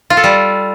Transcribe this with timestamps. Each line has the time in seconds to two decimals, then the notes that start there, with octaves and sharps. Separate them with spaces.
0.10 F4
0.17 A4
0.24 G3